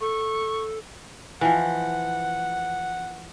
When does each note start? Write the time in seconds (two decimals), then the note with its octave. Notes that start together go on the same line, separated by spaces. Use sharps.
0.01 A4 C#6
1.41 E3 F3 F#5